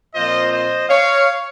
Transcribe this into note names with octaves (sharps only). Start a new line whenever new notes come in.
A#2 F3 C4 F4 C5 D#5
C5 D#5
C#5 F5